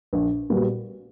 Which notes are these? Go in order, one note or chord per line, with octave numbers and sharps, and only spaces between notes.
A#1
A#2 G3 B3 F#4